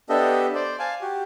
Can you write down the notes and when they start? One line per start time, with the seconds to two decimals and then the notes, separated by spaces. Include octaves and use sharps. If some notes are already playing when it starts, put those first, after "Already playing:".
0.09 B3 D4 G4 A4 D#5 E5
0.55 C5 D5
0.79 F5 G#5 A5
1.01 F#4 G4